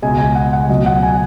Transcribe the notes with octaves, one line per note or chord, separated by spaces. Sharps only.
C#2 B2 G#3 G#5
G#5
F#5
F#5
C#2 B2 F#3 D#5
F#5
G#5